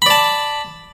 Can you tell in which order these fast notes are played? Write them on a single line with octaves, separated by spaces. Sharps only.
B5 D5 A5